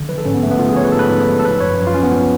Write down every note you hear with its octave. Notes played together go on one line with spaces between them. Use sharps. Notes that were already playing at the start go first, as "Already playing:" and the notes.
Already playing: D3
F3 B4
A4
G#2 C#4
B3
G#2 A3
B3
F3 F4
G#4
F3 C#5
B4
G#2 A4
B4
G#2
F3
A4
F3 B4
F#2 C#5
F#2
F4
F3 C#4
B3
F3